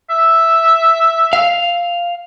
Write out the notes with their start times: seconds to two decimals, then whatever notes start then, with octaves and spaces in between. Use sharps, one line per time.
0.10 E5
1.33 F5